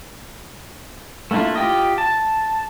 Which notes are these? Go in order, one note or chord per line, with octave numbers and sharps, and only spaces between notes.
A3 A#3 D4 E4 F4
F4 G4 D#5
A5